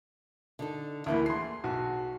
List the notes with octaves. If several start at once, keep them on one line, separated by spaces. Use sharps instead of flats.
D3 D#4 A4
D2 E3 A3 A#3 E4
G#4 C6 C7
B1 F#4